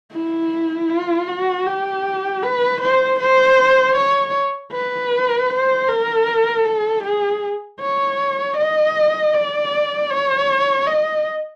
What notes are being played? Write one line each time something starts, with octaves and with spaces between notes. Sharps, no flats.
E4
F4
F#4
G4
B4
C5
C5
C#5
B4
C5
A#4
A4
G#4
C#5
D#5
D5
C#5
D#5